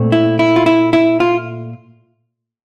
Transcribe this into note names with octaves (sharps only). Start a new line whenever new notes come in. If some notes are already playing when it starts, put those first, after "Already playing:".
Already playing: A#2 A3 C4
E4
E4
F4
E4
E4
F4